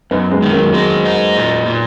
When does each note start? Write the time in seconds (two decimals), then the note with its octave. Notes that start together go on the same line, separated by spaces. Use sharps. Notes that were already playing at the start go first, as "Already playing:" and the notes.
0.11 F#2 B3 D#4
0.31 G#3 B3
0.42 D#3
0.52 F#3 A#3
0.74 F#3 G#3 A#3
1.05 D#4
1.36 A#2
1.67 A#2